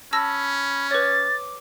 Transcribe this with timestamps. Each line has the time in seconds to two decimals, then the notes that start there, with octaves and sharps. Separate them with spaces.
0.13 C#4 A5 B5 E6 A#6
0.91 B4 C#5 D6 A6